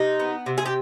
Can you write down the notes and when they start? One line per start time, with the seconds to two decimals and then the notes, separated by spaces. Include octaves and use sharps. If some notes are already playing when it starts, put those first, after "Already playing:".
Already playing: C3 D#4
0.20 B3
0.46 C3
0.58 G#4
0.66 G4